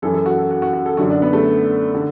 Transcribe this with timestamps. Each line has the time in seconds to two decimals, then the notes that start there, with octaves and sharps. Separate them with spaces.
0.02 F#2 E3 A4
0.14 A4
0.26 F#4
0.38 A4
0.51 F#4
0.62 F#4
0.73 F#4
0.86 A4
0.97 F#2 D3 F#4
1.10 D4
1.22 B3
1.33 A3
1.95 D3